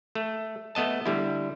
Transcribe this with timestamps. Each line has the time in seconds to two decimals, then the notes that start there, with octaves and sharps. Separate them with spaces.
0.15 A3
0.75 A3 B3 D#5 A5
1.05 D3 G3 E4